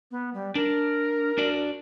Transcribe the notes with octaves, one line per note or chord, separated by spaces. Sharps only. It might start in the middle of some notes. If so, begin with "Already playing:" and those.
B3
G3
D4 A#4
D4 F#4 D5